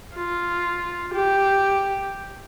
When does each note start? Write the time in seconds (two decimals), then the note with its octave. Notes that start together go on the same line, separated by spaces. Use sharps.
0.16 F4
1.14 G4